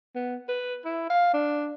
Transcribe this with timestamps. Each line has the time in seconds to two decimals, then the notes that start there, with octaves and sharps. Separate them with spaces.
0.15 B3
0.48 B4
0.85 E4
1.10 F5
1.34 D4